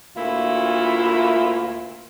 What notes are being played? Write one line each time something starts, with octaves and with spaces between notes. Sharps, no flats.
D2 A#2 E4 F4 E5